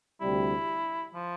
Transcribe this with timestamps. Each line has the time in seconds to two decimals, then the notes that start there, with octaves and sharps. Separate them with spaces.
0.21 D2 C3 G3 E4
1.14 F3